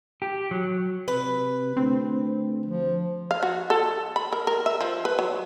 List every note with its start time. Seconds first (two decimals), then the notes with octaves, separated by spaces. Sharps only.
0.22 G4
0.51 F#3
1.08 C3 B4
1.77 D2 C4
2.66 F3
3.31 F5
3.43 F#4
3.70 A4
4.16 B5
4.32 A#4
4.47 A#4
4.66 E5
4.81 F3
5.05 B4
5.19 F#3